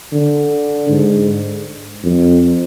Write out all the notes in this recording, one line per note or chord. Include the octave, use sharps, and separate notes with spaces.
D3
G#2
F2